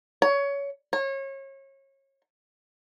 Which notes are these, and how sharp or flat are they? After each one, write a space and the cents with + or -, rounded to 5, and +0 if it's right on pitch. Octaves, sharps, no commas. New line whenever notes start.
C#5 +20
C#5 -30